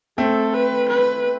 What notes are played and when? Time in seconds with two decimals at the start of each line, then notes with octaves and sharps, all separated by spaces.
0.18 A3 C4 A4
0.54 B4
0.89 B4